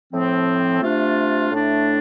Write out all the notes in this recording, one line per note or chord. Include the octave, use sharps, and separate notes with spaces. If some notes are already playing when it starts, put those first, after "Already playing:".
A2 F3 C4
C3 A3 D4 F4
A2 A3 D4